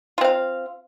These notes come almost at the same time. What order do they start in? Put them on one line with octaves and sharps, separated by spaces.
F4 C4 F5